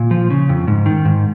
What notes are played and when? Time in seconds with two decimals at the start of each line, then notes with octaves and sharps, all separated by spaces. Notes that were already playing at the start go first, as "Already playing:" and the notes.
Already playing: A#2
0.11 F3
0.30 C#3
0.49 F2
0.68 G#2
0.86 D#3
1.05 G#2